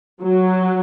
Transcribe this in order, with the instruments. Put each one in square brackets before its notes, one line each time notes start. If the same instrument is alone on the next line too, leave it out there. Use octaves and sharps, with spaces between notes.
[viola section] F#3